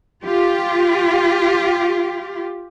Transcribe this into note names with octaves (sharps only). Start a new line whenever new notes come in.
F4 G4